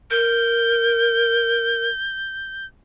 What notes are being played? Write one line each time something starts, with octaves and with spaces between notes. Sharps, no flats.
A#4 G6